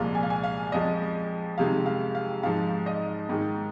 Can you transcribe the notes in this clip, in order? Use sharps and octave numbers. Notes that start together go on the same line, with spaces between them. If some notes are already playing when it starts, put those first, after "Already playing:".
Already playing: C2 A#2 F3 G#3 F5
G#5
F5
G#5
F5
F2 F3 G#3 D#5
F2 C3 D#3 G#3 F5
F5
F5
G#2 F3 G#3 F5
D#5
G#2 D#3 G#3